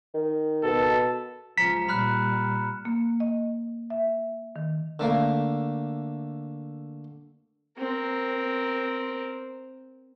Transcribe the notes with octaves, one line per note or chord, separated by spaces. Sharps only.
D#3
B2 A4
C#2 F3 A#5 B6 C#7 E7
A#2 G3 B5 F6 F#6
A#3
D#5
E5
D#3
D3 A3 A#3
C4 A#4